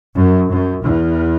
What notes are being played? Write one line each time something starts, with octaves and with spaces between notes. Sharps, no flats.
F#2
F#2
E2